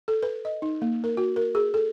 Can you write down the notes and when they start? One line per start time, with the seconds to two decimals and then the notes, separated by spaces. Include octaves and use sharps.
0.08 A4
0.23 B4
0.45 D#5
0.62 D#4
0.82 A#3
1.04 A#4
1.17 F#4
1.36 A#4
1.55 G#4
1.74 A4